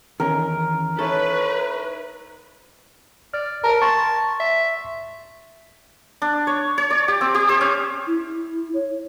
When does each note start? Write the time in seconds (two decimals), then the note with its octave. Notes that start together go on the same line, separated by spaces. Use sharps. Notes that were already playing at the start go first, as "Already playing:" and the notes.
0.20 E2 D#3 C#4 A#4
0.99 D#4 E4 A4 B4 C#5
3.34 D5 F6
3.64 A#4 A5 A#5
3.82 A5 C6 C#6
4.40 E5
6.22 D4
6.47 C#5
6.78 C#5
6.90 D5
7.08 G4
7.21 C4
7.35 G4
7.49 C5
7.61 C#4
8.07 E4
8.74 C#5